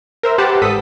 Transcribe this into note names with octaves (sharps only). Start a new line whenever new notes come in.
A#4 C5 E5
G4 B4 C5 F#5 A5
G#1 A4 D#6 B6